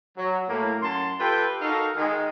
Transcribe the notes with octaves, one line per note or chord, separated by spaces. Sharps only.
F#3
A2 A#3
F#2 A5 C6
F4 G4 A4 B4 G5
D#4 F#4 A4 A#4 F5
D#3 G#3